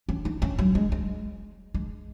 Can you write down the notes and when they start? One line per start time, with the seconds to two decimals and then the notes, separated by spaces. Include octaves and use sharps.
0.09 C#4
0.25 D#4
0.42 C#4
0.59 F#3
0.75 G#3
0.92 G#3
1.74 G#3